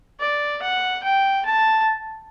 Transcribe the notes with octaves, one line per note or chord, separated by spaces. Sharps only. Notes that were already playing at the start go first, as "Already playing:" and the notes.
D5
F#5
G5
A5